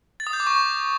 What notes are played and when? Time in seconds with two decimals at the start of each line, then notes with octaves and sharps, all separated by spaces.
0.20 A6
0.27 D#6
0.33 G6
0.40 D6
0.47 C#6